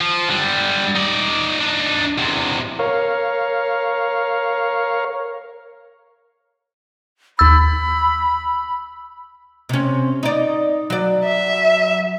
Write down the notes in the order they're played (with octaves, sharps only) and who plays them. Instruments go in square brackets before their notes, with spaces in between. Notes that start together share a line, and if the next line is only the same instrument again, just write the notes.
[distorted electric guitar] F3
D3 G3
D#4 D5
D4 D#4
E2 C3
[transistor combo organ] A#4 C#5 F5
[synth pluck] D#2 A6 [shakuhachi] B5 [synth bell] E6
[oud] C3 C#4
D#4 D5
F#3 D5
[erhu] E5